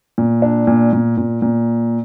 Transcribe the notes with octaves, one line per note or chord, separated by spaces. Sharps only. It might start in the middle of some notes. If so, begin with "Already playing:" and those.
A#2
D4
A#2
A#2
A#2
A#2